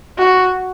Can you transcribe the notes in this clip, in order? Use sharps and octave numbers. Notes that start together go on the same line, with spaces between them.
F#4